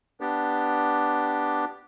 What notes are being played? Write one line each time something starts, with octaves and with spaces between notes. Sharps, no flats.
B3 D4 G4